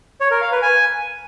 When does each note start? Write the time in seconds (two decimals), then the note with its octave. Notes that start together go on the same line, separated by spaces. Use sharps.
0.21 C#5
0.31 A#4
0.41 F5
0.52 B4
0.62 G#5